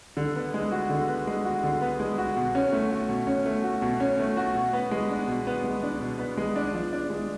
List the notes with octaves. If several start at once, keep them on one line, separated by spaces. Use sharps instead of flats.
D3
B3
G#3
F#4
D3
B3
G#3
F#4
D3
B3
G#3
F#4
B2
C#4
A3
F#4
B2
C#4
A3
F#4
B2
C#4
A3
F#4
B2
B3
G#3
D4
B2
B3
G#3
D4
B2
B3
G#3
D4
F3
D4
G#3